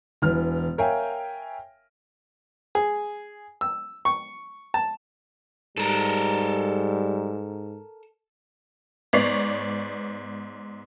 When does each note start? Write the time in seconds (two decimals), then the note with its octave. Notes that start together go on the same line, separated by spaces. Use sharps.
0.22 E1 E3 F6
0.78 A#4 C#5 E5 F5 G5 G#5
2.75 G#4
3.61 E6
4.05 C#6
4.74 A5
5.78 G#2 G3 A4 A#4
9.13 G#2 B3 C#5 D5 B6 C7